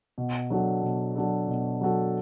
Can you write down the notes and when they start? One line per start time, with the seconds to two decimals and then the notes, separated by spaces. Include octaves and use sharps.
0.18 B2
0.50 F#3 D4 F#4 A4
0.83 B2
1.16 F#3 D4 F#4 A4
1.48 B2
1.81 F#3 D4 F#4 A4